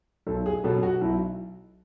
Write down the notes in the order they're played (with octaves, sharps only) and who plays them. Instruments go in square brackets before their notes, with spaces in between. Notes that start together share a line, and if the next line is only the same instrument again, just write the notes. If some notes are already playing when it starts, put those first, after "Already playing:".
[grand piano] B1 A4
G#4
B2 F#3 A4
F#4
B1 E4